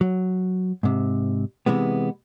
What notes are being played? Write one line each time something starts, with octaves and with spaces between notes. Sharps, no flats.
F#3
G#2 C3
C3 E3 G#3 B3